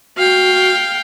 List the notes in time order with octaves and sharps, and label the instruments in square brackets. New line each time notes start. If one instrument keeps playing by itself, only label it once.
[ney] F#4 [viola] F5 G5